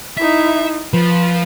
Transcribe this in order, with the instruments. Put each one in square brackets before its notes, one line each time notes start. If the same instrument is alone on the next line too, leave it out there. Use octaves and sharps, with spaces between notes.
[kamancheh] D#4 E4 [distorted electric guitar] E5
[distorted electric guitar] F3 [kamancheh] B4